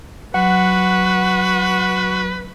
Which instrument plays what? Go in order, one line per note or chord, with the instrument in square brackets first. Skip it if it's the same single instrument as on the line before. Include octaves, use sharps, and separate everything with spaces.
[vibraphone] F#3 [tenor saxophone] F#4 [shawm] B4 [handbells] F#5